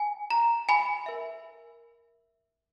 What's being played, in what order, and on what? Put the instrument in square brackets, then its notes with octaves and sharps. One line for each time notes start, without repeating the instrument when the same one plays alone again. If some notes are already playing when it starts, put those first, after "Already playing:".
Already playing: [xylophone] G#5
A#5
G#5 B5
A#4 E5